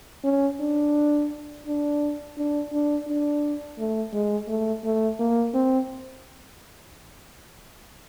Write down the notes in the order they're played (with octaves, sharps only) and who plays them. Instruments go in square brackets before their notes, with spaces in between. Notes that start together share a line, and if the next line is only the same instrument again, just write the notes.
[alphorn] C#4
D4
D4
D4
D4
D4
A3
G#3
A3
A3
A#3
C4